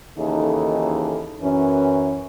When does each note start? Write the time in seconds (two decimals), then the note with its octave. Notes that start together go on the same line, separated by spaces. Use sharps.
0.18 D#2 C#3 E3 D#4 A4
1.42 F#2 E3 C#4